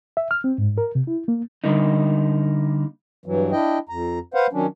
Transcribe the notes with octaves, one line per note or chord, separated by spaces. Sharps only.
E5
F6
C4
G#2
A#4
C3
E4
A#3
D3 G3 A#3 D#4
G2 E3 F#3
D4 E4 D#5 G5
F2 A#5
B4 C5 F5 F#5
D#3 F#3 C#4 D4